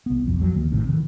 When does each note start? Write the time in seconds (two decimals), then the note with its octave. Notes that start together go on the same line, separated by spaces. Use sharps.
0.06 C2 B3
0.27 F#1 C2 F2
0.40 F2 F3 F#3
0.54 D2 D#3 A#3
0.71 G#1 A2 C3 D#3
0.88 C3 D#3 E3